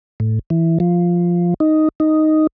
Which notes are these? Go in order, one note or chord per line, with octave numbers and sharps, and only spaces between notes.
A2
E3
F3
D#4
D#4